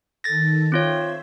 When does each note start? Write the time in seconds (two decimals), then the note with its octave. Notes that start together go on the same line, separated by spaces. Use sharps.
0.24 D#3 A4 A6 A#6
0.72 C4 F4 C5 C#5 E5